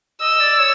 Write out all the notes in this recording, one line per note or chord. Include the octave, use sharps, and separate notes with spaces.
D#5 E6
D5
C#5